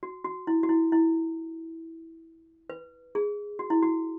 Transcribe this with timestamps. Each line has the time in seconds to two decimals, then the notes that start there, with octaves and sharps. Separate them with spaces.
0.03 F#4
0.25 F#4
0.47 E4
0.63 F#4
0.69 E4
0.92 E4
2.70 B4
3.15 G#4
3.59 F#4
3.70 E4
3.83 F#4